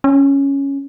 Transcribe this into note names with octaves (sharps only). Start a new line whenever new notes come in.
C#4